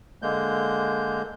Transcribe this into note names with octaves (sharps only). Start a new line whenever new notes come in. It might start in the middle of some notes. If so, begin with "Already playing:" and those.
D3 G#3 A#3 G6